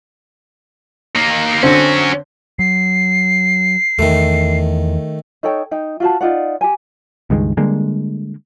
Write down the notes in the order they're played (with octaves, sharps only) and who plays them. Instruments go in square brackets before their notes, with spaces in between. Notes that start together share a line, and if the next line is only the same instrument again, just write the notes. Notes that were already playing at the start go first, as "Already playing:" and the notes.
[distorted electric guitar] A#3 D#4
[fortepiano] D3 C4 [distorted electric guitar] C#4 F#4
[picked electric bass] F#3 [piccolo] C7
[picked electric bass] E2 [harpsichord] D#3 A3
[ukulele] D#4 A4 C#5 G5
D#4 G5
F4 F#4 A5
D#4 F4 D5 F#5
G4 G#5
[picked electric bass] C#2 G2 D#3 G#3
D3 G3 G#3 A#3